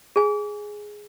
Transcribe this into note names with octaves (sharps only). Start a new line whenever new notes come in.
G#4 G#5